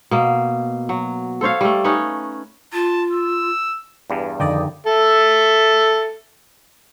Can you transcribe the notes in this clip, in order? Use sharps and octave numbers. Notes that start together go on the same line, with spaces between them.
B2 A#3
F#3
A4 C5 C#5 F5
G3 A3
C#4 D#4 B4 C#5
F4 A5
E6
E2 G2
F2 D3 D#3 D5 D#5 G5
A4 E5